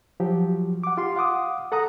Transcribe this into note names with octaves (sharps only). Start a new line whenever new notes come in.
F3 F#3 G4
F#5 D6
F4 G4 C6
F5 F#5 D6 D#6
A4 F#5 A#5 D#6